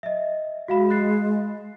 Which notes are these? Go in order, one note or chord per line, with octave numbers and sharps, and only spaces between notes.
D#5 E5
G#3 F#4 F5 B5
F#6 A6 C7